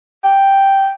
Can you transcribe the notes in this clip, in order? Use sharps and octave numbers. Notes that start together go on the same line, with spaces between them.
G5